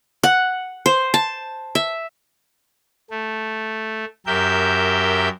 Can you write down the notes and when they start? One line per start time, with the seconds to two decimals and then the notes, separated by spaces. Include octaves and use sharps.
0.23 F#5
0.86 C5
1.14 A5
1.75 E5
3.11 A3
4.27 F#2 G4 A#4 E5 G6